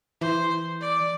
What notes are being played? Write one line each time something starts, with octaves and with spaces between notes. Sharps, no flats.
E3 C5
D5